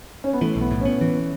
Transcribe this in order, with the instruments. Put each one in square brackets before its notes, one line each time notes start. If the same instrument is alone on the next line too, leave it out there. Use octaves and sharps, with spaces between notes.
[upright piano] C#4
B3
[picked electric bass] E3 [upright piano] A3
[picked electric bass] B1
[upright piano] B3
[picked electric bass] A2
[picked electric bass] B3 [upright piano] C#4
[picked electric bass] E3